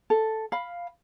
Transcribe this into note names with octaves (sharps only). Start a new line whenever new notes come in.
A4
F5 B5